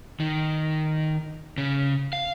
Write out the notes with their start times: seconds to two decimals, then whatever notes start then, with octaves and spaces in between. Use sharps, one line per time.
0.20 D#3
1.58 C#3
2.13 F5